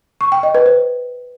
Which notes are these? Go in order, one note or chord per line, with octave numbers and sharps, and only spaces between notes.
C#6
G5
D#5
B4
C5